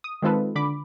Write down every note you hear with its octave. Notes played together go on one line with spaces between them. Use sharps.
D#6
D#3 G#3 C4 F4 A4 B4
D3 B5 D6